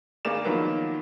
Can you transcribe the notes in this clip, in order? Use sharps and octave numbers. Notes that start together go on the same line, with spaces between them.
G#1 A#3 G#4 D5 E7
D#3 F3 F#3 A#3 B3